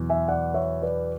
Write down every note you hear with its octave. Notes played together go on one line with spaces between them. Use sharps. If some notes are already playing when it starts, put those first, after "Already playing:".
Already playing: E2 B2 F#3
E5 G#5
D5 F#5
C#5 E5
B4 D5